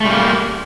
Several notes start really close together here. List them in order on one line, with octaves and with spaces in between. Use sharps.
A3 G3 A#3